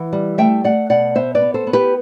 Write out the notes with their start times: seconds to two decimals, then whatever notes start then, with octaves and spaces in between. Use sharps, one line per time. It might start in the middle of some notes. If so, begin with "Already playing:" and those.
Already playing: E3 F#5
0.13 G3
0.38 A3 E5 G5
0.64 A3 D5 F#5
0.90 B2 D5 F#5
1.15 B3 C5 E5
1.35 B4 D5
1.41 B3
1.54 A4 C5
1.67 B3
1.73 G4 B4